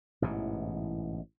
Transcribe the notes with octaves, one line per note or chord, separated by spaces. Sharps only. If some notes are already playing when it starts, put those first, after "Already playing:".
A1 G#2 B2 E3